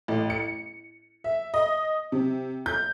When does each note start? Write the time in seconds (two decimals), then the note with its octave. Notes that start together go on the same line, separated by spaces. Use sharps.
0.08 A1
0.30 C#7
1.24 E5
1.54 D#5
2.12 C3
2.66 G6